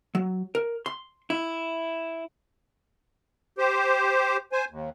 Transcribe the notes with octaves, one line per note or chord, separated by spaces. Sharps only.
F#3
A#4
C6
E4
G4 C5
C5 G#5
D#2